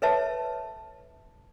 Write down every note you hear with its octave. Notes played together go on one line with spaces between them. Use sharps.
A4 B4 C#5 E5 A5